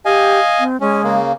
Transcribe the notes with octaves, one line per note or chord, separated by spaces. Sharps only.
G4 D#5 F5 G#5
C4
G#3 C#4
C#3 A#3